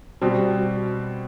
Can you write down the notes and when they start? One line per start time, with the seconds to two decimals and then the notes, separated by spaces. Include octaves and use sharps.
0.22 B2 G3 C4 F#4
0.36 G4
0.50 F#4